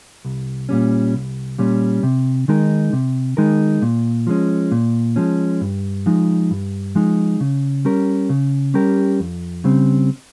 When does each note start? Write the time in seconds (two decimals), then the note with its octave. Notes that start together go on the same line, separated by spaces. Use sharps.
0.25 C2
0.69 A#2 G3 C#4
1.14 C2
1.58 A#2 G3 C#4
2.03 C3
2.48 D#3 G#3 D#4 A#4
2.93 C3
3.37 D#3 G#3 D#4 A#4
3.82 A#2
4.27 F3 G#3 C#4
4.72 A#2
5.16 F3 G#3 C#4
5.61 G2
6.06 F3 G#3 D#4
6.51 G2
6.95 F3 G#3 D#4
7.40 C#3
7.85 G3 C#4 G4 A#4
8.30 C#3
8.74 G3 C#4 G4 A#4
9.20 F2
9.64 C#3 G3 C4